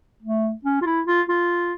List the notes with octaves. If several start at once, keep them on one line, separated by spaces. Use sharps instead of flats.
A3
C#4
F4
E4
F4
F4